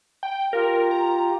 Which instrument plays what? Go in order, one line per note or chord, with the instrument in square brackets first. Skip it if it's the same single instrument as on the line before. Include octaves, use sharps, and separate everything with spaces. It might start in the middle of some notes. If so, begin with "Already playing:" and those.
[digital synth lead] G5
[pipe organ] F4 G4 [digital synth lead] A#4
[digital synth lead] A#5